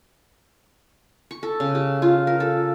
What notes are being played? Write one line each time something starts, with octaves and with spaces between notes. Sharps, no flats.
C#6
A4
C#3
G4
F4
A#4
A4